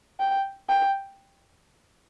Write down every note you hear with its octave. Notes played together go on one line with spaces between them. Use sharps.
G5
G5